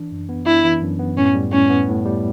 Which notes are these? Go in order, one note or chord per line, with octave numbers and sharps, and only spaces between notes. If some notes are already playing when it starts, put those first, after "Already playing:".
Already playing: E3 D4
F#2
B3
D4 E4
E3
F#2
B3
A2 C#4
G3
A2 C#4
B3
A2
G3